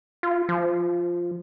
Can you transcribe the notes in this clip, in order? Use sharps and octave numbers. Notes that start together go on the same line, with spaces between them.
F4
F3